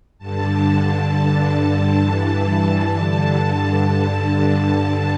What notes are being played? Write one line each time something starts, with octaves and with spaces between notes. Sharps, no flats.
G2 D3 A5
G2 D3
G2 E3
G2 D3